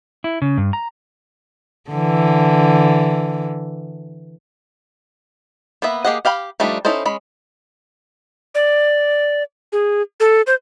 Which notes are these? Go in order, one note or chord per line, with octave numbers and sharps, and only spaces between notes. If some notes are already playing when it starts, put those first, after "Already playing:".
E4
C#3
G2
A#5
D3 E3
A#3 B3 B4 E5
A#3 G4 G#4 D#5 F#5
G4 F5 G5 B5
F3 G3 A3 D4 D#4
C#4 D#4 E4 A4 C5
G#3 C#4 B5
D5
G#4
A4
C5